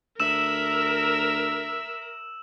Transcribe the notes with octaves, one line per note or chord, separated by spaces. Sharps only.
D2 A#4 E5 E6 E7